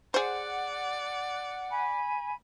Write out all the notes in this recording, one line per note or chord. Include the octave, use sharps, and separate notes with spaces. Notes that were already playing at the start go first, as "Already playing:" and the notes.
G#4 C5 D5 F#5
G#5 B5